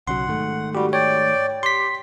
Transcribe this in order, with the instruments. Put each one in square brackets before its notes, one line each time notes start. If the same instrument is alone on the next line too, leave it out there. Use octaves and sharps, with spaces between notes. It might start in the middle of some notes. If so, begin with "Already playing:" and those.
[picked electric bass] B1 C#3 F#3 [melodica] F#5 [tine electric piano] C6
[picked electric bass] G#2 D#3 A3
[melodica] G3 [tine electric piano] F#4 G4
[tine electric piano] C#5 [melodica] D5 G5
[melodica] G4 [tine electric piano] C6 B6